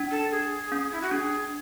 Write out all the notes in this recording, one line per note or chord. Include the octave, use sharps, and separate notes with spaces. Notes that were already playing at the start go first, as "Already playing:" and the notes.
Already playing: D4
A4
G#4
C#4
E4
F#4
D4 G#4